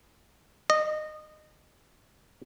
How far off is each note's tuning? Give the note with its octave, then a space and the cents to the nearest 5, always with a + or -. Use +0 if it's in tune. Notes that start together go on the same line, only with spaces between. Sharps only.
D#5 -20